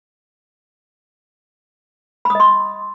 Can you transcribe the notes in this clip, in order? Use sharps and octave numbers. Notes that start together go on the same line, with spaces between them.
D#5 B5 C6 D#6